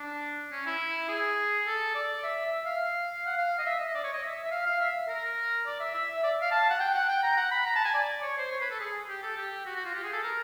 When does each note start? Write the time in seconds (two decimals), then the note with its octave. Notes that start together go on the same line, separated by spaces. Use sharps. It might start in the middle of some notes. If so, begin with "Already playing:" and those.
Already playing: D4
0.52 C#4
0.66 E4
1.09 G#4
1.66 A4
1.95 D5
2.24 E5
2.52 E5
2.66 F5
3.26 F#5
3.37 F5
3.59 D#5
3.66 E5
3.80 D#5
3.95 D5
4.04 C#5
4.13 D#5
4.23 E5
4.44 E5
4.51 F5
4.66 F5
4.80 E5
5.08 A#4
5.66 D5
5.80 E5
5.94 E5
6.23 D5
6.42 F5
6.51 A5
6.70 F#5
6.80 G5
6.94 F#5
7.08 G5
7.23 A#5
7.37 F#5
7.51 B5
7.66 A#5
7.76 A5
7.85 G#5
7.94 D5
8.22 C#5
8.38 C5
8.52 C#5
8.61 B4
8.71 A4
8.80 G#4
9.09 G4
9.23 A4
9.37 G4
9.66 F#4
9.76 F#4
9.85 F4
9.94 G4
10.03 G#4
10.13 A4
10.23 A#4